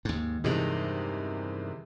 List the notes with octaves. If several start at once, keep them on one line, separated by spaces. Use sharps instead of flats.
D#2 G#2
E2 G2 C3 D#3 G#3